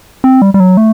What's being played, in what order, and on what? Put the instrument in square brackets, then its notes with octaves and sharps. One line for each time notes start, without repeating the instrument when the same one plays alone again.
[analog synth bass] C4
G3
G3
F#3
A3